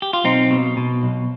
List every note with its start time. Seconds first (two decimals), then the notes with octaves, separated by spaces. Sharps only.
0.02 G4
0.13 F4
0.24 B1 C4 D#4
0.51 B2
0.77 B2
1.03 B1